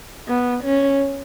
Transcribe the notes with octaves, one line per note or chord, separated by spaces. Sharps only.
B3
C#4